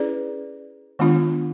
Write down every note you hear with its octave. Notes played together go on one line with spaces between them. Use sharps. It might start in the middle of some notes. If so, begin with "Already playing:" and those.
Already playing: C#4 E4 G#4 B4 D5
D#3 G#3 B3 D4 F4